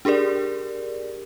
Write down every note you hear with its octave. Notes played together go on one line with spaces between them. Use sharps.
D4 G4 G#4 A#4 D5